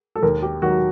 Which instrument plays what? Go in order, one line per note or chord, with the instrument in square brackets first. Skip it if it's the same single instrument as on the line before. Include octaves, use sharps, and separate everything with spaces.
[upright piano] A4
D#2 A#4
G4
D#3 F#3 F#4